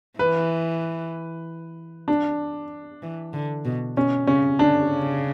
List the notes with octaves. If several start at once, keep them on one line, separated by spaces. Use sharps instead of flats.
E3 B4
D4
E3
D3
B2
B2 C#4
C#3 C#4
D3 D4
C#3